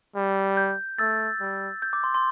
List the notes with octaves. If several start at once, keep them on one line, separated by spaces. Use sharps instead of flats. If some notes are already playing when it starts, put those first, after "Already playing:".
G3
G6
A3 E6 A6
G3
G6
D6
C6
C6